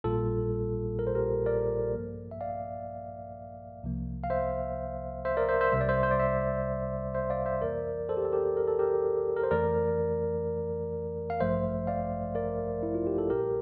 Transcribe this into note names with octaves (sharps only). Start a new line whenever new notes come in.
A#1 A#2 G3 A#3 F4 A4
A#4
C5
G4 A#4
A#4 D5
G2 F3 A#3
E5
D5 F5
C2 C3 F3 A#3
F5
C5 E5
C5 E5
A#4 D5
C5 E5
C5 E5
C2 C3 G3 E5
D5
C5 E5
C5
D5
C5 E5
C5 E5
D5 F5
C5 E5
F2 E3 A#3 A#4 D5
A4 C5
G4
A4
G4 A#4
A#4
A4
G4 A#4
A#4
C5
F2 E3 A3 A#4 D5
F5
A1 G2 F3 A3 C5 E5
D5 F5
A#4 D5
E4
F4
G4
A4
A#1 A#2 G3 G4 A#4